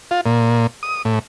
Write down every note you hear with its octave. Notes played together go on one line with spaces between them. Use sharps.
F4
A#2
D#6
A2